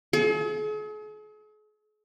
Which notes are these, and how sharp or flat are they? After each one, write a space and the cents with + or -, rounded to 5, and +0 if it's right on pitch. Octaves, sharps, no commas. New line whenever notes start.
G#4 +45